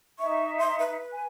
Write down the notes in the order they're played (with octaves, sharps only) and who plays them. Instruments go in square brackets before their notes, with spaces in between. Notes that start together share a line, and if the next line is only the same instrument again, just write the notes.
[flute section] D#4 E5 [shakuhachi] C#6
[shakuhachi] C6
B4
[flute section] G#5